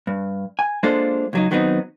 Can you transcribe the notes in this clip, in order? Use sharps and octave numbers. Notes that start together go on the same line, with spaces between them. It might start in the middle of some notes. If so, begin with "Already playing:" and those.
G2
G#5
G#3 A#3 D4 F4 A4 C5
C#2 F#3 D#4
D#3 F#3 B3 C4 D4 D#4